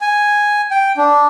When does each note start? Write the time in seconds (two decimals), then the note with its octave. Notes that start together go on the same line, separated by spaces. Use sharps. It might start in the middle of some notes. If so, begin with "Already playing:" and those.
0.01 G#5
0.71 G5
0.97 D4